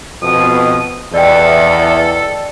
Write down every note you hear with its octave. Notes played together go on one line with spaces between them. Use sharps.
F2 B2 D#6
E2 A4 D5 D#5 G5